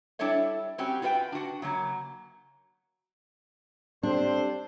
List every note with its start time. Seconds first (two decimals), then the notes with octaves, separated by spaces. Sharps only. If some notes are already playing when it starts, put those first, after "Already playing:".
0.19 G3 D4 E4 A4 C#5 E5
0.78 G3 C4 C#4 F#4 G4
1.02 F4 F#4 B4 F5 G5
1.32 D4 F#4
1.62 C#3 F#3 A#3
4.03 G3 C4 D4 A4 C5